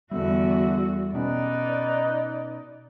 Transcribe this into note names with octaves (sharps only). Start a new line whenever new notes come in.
E2 D3 G3 B3 F#4 E5
B2 B3 C#4 D#4 B4 D5